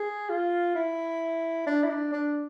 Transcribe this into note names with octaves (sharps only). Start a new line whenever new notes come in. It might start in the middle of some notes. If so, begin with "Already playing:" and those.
Already playing: G#4
F4
E4
D4
E4
D4
D4